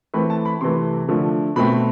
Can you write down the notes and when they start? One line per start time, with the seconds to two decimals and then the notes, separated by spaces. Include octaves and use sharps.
0.14 E3 A3 C4 B5
0.30 A5
0.45 B5
0.61 C3 E3 A3 C6
1.09 D3 F3 A3
1.56 B2 A3 C4 B5